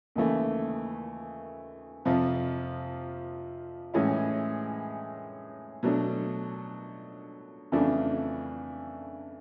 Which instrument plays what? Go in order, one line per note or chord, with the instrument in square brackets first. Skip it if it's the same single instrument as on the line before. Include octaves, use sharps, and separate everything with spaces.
[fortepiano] D#2 C#3 E3 A3
F2 C3 F3
A2 E3 G#3 C#4 E4
B2 F#3 A3 D4
F2 C#3 E3 A3 D4